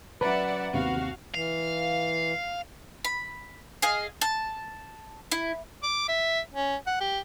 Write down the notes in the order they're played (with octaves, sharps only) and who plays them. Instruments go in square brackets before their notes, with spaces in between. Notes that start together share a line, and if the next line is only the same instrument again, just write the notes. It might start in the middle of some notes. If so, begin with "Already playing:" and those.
[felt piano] F#3 C#4 A#5 [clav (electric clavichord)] B4 [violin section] D5 E5 F#5
[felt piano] G1 D#2 C3 [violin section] F#4 F5
[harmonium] E3 [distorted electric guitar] F5
[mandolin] B5
G#4 D#5 F5
A5
E4
[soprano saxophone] D6
E5
C#4
F#5
G4